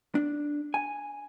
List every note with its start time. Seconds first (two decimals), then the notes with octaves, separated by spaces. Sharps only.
0.15 D4
0.74 G#5